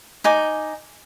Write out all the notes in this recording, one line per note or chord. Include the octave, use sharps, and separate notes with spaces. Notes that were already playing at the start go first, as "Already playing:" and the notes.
D#4 G#5 D6